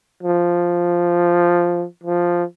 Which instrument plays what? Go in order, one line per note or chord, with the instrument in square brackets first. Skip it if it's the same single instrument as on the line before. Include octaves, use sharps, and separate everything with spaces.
[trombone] F3
F3